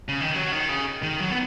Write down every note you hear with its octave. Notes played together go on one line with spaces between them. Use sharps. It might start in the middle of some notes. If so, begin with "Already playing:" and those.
C#3
D#3
F#3
D#3
C#3
D#3
F#3
B3